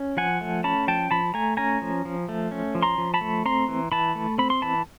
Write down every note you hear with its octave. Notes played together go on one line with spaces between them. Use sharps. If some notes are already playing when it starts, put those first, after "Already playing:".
Already playing: C#4
F3 F#5 G#5
A3
C#4 A5 B5
F3 G5 A5
F3 A5 B5
A3 G#5 A#5
C#4 G#5 A#5
F3
F3
A3
C#4
F3
A#5 C6
F3
A5 B5
A3
C4 A#5 C6
E3
E3 A5 B5
A3
C4 B5
C6
E3 A5 B5